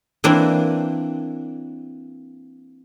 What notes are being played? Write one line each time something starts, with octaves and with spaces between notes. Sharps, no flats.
E3 A#3 C4 D4 E4